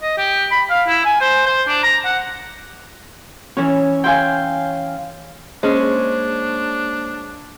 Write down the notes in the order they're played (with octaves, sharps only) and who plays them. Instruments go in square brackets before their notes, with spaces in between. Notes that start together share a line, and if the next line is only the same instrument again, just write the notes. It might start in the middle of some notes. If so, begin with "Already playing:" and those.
[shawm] D#5
G4
B5
F5
E4
G#5
C5
C5
D4
A#5
F#5
[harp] E3 C#4 [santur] C#5
[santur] F5 C6 [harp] G5 G#5
[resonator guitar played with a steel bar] G#3 C#4 [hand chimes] A#3 C5 [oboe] D4